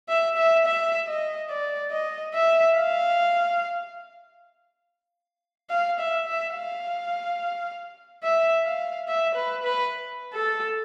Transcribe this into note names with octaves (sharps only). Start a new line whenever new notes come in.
E5
E5
E5
D#5
D5
D#5
E5
F5
F5
E5
E5
F5
E5
F5
E5
B4
B4
A4